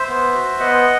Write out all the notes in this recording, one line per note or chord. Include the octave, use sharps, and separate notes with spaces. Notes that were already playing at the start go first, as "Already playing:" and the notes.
Already playing: C5 E5
B3
F#4
B3 D#5 F#5